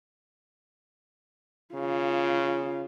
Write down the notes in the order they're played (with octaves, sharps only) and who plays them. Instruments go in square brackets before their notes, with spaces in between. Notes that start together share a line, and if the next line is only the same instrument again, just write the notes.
[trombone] C#3 [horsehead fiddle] F4